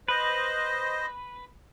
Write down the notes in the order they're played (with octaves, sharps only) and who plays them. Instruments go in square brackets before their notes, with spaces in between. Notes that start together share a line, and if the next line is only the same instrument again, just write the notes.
[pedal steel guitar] B4 [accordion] C5 D#5